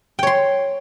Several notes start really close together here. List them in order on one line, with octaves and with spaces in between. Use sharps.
G5 C#5 C6